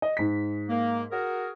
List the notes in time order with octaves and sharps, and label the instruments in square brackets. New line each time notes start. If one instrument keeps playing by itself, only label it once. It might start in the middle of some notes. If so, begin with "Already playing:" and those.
[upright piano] D#5
G#2 B6
[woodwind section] A#3
F#4 G#4 A#4